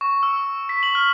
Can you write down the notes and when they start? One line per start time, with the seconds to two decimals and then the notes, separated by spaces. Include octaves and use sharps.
0.01 C#6
0.23 E6
0.69 B6
0.83 F#7
0.95 F6